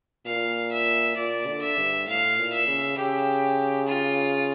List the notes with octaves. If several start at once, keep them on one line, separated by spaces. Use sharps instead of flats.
A#2 F5
E5
A#2 D5
D3
E5
G2
A2 F5
A#2
E5
C#3
C#3 G4
F4